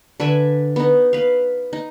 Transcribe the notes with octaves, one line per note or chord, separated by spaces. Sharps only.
D3 B4 E5 G#5
B3 D#4
B4 F5
D#4